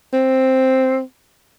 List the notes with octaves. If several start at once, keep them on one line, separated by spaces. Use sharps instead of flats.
C4